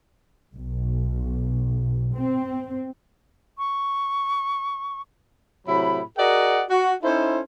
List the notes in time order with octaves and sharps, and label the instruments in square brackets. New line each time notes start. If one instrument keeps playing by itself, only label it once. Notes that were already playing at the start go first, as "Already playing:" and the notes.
[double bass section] B1
C4
[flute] C#6
[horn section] A2 C3 F#3 E4 B5
F#4 G#4 A#4 D5 D#5 F#5
F#4
C#4 D#4 E4 A4 C5